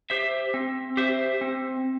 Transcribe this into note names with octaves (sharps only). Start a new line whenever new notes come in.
G4 C5 E5
C4
G4 C5 E5
C4